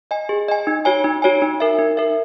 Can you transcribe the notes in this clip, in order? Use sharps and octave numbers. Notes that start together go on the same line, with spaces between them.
D#5 G#5
G#4
D#5 G#5
D#4
F#4 C#5 G#5
D#4
F#4 C#5 G#5
D#4
A#4 E5
D#4
A#4 E5